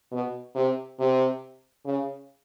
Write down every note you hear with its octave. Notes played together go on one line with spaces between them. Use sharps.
B2
C3
C3
C#3